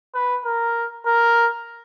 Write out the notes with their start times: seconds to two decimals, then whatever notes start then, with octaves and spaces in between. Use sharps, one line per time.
0.14 B4
0.45 A#4
1.06 A#4